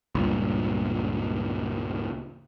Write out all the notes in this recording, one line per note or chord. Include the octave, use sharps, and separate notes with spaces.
C#2 G2 A#2